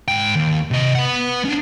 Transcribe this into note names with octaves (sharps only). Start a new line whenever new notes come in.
G#2 G5
D#2
C3 D#5
B4 F#5
C#4 D4